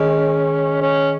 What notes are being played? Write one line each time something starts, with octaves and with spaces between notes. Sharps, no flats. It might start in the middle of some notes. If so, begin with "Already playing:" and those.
Already playing: D#3 G#3 C#4
C#4